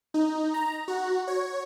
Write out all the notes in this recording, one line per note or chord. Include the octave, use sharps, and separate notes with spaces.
D#4
A#5
F#4
C#5